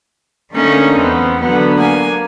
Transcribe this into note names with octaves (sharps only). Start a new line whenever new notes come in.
D3 A3 A#3 C#4 D#4
E2 B3 C4
D3 F#3 B3
A#3 G#5